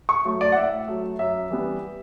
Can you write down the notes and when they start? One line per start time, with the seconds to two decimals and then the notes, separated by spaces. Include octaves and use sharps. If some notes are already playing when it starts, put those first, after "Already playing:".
0.09 C#6
0.25 F#3 A3
0.41 D5
0.52 F#5
0.56 A2 E5
0.88 F#3 A3
1.19 F#2 E5
1.50 E3 G3 B3